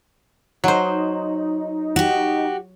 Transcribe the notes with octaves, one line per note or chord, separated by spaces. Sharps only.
F#3 D#4 C5
F#4 G4